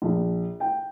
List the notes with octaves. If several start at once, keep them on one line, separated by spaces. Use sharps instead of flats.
A#1
G5